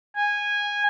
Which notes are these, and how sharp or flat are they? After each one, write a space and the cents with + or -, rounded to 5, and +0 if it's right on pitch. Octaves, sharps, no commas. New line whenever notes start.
G#5 -15